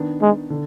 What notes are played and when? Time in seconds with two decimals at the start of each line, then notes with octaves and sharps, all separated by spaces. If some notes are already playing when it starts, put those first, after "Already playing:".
Already playing: D#3 B3 D4
0.22 G#3
0.50 D3